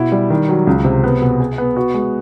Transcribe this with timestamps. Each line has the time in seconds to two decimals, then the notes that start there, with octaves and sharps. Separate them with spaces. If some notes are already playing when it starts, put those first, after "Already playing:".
Already playing: B2 E4
0.12 G3
0.30 D#3
0.49 F#3
0.67 C#2
0.85 C3
1.04 B3
1.22 B2
1.40 G#4
1.58 B3
1.76 F#4
1.94 G#3